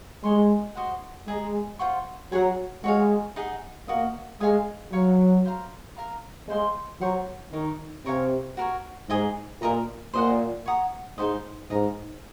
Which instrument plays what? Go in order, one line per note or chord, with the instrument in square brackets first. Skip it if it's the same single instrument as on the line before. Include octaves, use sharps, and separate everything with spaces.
[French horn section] G#3 [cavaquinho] C#5 G#5 C6
[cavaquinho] F#4 C5 D#5 F#5
[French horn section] G#3 [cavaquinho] G#4 D#5 A#5
[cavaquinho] F4 C5 F#5 C#6
[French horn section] F#3 [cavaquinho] G#4 C#5 F#5 A#5
[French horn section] G#3 [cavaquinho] F#4 C#5 F5
[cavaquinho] D#4 G#4 D#5 F#5
[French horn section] A#3 [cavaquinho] F#4 A#4 D#5
[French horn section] G#3 [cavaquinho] C#5 F5 G#5 D#6
[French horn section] F#3 [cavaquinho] C#5 F5 A#5 C#6
[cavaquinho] C5 F5 A#5
A#4 F5 A#5
[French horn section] G#3 [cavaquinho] C5 F5 C6
[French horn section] F#3 [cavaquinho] C5 F#5 A#5 C#6
[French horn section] D#3 [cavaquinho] D#4 A#4 C#5
[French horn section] C3 [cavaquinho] A#4 C#5 F5 G#5
[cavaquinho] F#4 A#4 C#5
[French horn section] G#2 [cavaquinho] G#4 D#5 G#5 D#6
[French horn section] A#2 [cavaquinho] A#4 D#5 A#5
[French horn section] A#2 [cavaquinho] C5 D#5 F#5
[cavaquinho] C#5 F#5 A#5 D#6
[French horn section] G#2 [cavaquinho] D#4 F#4 C5 D#5
[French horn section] G#2 [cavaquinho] A#4 D#5 A#5